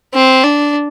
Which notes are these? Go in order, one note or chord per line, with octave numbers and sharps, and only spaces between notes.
C4
D4